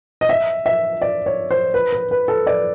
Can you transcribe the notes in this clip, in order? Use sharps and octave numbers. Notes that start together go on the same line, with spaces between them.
D#5
E5
E5
D5
C#5
C5
B4
B4
B4
A4
D5